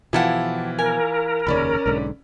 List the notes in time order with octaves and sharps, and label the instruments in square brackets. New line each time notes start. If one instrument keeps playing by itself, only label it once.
[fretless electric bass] B2 F3 [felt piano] E3 E4 F4 [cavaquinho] G4 A4 F#5
[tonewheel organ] A#4 [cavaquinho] G#5
[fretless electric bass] F1 D#2 C#3 [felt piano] C#4 D5 B5
[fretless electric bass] B1 G#2 D3